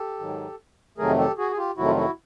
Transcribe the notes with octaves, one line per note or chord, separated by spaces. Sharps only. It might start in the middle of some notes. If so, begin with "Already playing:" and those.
Already playing: G4 A4
G#2 D#3 F#3
F2 C3 D#3 F#3 A3 G#4 A#4
G4 A4
F#4 G#4
G#4
F4 G4
F2 C3 D#3 F#3 A3 E4 F#4
F4
E4 F#4